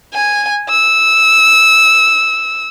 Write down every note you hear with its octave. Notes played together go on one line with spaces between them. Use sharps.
G#5
E6